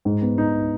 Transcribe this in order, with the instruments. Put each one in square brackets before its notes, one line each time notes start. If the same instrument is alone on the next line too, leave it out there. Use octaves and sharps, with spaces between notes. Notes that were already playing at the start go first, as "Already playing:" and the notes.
[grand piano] G#2
B3
D#4